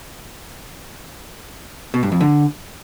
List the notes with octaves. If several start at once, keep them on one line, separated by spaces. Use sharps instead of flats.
B2
G2
F2
D3